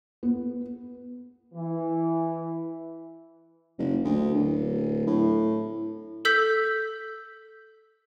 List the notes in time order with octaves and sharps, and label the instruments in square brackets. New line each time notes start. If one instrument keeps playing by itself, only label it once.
[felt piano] B3
[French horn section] E3
[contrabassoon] F#1
D2
D1
A2
[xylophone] A4 E6 G6 B6